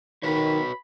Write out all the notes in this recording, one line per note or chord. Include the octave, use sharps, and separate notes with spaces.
D#3 F#4 B4 C#5 B5